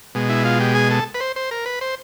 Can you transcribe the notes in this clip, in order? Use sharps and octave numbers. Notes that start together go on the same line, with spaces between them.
B2 G#3
E4
F4
G4
G#4
A4
B4
C5
C5
A#4
B4
C5